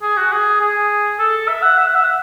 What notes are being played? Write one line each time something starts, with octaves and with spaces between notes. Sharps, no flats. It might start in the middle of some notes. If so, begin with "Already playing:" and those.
G#4
F#4
G#4
G#4
A4
E5
F#5
E5
F#5
E5
F#5